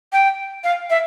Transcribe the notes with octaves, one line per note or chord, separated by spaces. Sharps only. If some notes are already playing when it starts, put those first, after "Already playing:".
G5
F5
E5